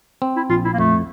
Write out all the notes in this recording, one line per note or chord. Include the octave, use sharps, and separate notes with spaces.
C4
E4
A#1 F4
E4
A#3
F2 A3